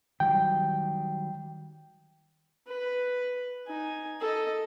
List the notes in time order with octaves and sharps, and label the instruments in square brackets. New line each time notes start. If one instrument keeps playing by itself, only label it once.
[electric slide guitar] D#3 F#3 G3 [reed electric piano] G5
[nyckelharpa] B4
D#4 G#5
A4 D#5